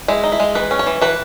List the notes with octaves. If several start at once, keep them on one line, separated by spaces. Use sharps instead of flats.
G#3 E4
D#4
E4
G#3
E3 B4
C#4
C#5
E3
E3 B4